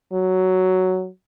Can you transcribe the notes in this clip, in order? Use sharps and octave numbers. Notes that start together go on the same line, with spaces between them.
F#3